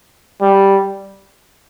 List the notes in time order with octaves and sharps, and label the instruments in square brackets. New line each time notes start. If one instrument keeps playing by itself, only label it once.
[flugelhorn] G3